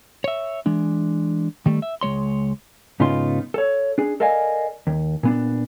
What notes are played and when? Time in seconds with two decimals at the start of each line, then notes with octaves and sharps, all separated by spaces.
0.24 C#5 E5
0.66 E3 G#3 D4
1.66 D#3 G3 A3
1.82 E5
2.01 C#2 G#3 C#5 C6
3.00 G#2 C#3 B3 D#4 F4 C6
3.54 A4 C#5
3.98 D4 G#4
4.20 A4 A#4 D5 D#5 F5 G#5
4.87 D#2
5.23 A#2 B3 D4